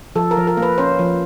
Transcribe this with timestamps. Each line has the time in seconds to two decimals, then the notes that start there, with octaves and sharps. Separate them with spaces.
0.16 F3 A4
0.31 A#4
0.37 F3
0.47 A#4
0.57 A#3
0.62 B4
0.78 C#4 C5
0.99 F3